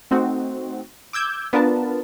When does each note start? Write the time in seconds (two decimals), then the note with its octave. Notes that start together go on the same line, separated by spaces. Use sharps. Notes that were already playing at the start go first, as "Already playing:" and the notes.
0.11 A3 C4 D#4 F#4
1.13 D6 E6 G6 G#6
1.53 B3 D4 F4 A#4 B4 A5